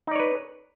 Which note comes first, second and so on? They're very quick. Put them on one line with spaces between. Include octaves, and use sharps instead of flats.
D#4 D5 C#5 B4